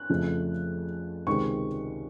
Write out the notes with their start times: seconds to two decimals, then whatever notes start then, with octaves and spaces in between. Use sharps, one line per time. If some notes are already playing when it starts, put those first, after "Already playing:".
Already playing: F#6
0.10 F2 C#3 F3 A3
1.27 C#2 C3 D#3 G#3 C4 C#6